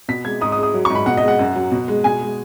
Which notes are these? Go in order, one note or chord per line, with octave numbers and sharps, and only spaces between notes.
B2 B6
G#3 G#6
G#2 D#6
D#6
G#3
D#6
F#3
C#6
G#2
B5
B2 F#5
D#5
G#3
F#5
F#2
F#3
B2
G#3
B2 G#5
G#3